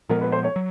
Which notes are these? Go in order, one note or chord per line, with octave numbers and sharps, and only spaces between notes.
A#2 F3 G#3 B3 A#4
B4
C5
C#5
F#3